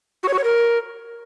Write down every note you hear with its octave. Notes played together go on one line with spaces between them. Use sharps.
F#4
C#5
F#4
C#5
A#4